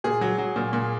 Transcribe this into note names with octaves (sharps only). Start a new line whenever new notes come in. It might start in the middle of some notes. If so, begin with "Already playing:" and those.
A#2 G#4
F#3
F#3
A#2
A#2